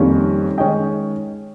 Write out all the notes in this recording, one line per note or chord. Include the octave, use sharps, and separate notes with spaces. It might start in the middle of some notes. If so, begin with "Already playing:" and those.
Already playing: F2 D#3 G3 A#3 C#4
D#3 G#3 C#4 D#5 G5